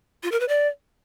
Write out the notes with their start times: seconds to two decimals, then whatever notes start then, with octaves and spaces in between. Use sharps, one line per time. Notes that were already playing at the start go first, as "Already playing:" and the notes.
0.23 F4
0.32 A#4
0.40 B4
0.49 D5